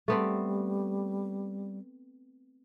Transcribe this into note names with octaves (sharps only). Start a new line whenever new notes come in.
G3 A3 B3 C4